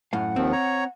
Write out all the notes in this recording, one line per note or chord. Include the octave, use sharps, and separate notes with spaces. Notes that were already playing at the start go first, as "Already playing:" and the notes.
F#2 A2 F5 F#5
D#2 D#3 F3 C4
C#5 A#5